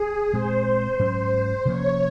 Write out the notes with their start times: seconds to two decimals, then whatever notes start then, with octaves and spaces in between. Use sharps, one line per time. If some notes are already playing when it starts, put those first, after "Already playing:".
Already playing: G#4
0.33 A#2 G#3 C4 C5
0.99 G#2 F#3 C#4
1.65 C3 F3 A#3 C#4 C#5